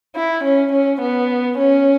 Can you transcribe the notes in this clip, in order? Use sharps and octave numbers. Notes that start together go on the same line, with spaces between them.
E4
C#4
C#4
B3
C#4